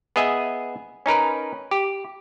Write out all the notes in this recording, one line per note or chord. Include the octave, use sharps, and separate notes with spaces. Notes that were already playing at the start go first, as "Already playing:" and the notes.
B3 G#4 D#5 E5 G#5
C#4 D#4 A#4 B4
G4